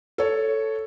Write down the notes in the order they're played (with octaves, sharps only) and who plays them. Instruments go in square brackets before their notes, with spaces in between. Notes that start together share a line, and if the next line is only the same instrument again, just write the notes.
[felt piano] A4 C#5